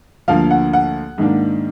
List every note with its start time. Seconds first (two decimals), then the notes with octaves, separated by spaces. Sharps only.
0.28 D2 D3 F3 A#3 F5
0.51 F#5
0.73 F#5
1.18 G#2 D#3 A#3 D4